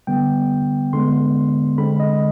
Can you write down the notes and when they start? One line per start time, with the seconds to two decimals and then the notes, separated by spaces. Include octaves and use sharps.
0.07 D3 G3 B3 G5
0.93 D3 G#3 B3 C6
1.78 D3 G#3 C4 B5
2.00 D#5